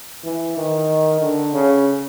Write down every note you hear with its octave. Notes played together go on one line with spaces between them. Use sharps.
E3
D#3
D3
C#3